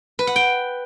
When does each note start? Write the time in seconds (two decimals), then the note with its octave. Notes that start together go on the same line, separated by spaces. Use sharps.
0.19 B4
0.27 F#5
0.36 G5